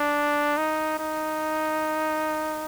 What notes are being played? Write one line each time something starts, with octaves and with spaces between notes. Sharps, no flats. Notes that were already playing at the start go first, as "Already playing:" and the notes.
Already playing: D4
D#4
D#4